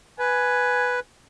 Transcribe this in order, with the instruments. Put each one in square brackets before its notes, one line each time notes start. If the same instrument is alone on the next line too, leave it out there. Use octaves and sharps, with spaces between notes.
[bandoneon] B4 [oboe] G#5